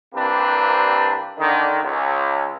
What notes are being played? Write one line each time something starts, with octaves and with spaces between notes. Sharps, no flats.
C2 C3 A#3 C4 D4 B4
D3 D#3
C#2